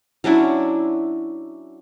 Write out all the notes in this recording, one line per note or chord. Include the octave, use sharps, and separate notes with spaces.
F#3 C#4 D4 E4